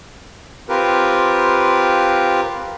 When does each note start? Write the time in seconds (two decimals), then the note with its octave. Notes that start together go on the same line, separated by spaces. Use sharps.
0.69 C4 F4 G4 A#4 B4